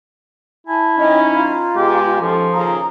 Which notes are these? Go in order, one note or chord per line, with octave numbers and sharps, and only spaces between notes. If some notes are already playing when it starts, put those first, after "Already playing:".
E4 G#5 A5
F3 C#4 D#4 D#5 G5
F4 A#5
B2 G#3 G4
G#2 F3 C#4 A4
D#2 C#3 F4 A#5 D#6